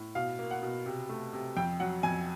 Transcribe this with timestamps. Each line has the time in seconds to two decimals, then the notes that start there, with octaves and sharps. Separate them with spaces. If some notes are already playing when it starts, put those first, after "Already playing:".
Already playing: A2
0.15 B2 F5
0.39 A#3
0.51 F#5
0.63 B2
0.86 C3
1.09 A3
1.33 C3
1.57 F2 G5
1.80 F#3 F#5
2.03 F2 G#5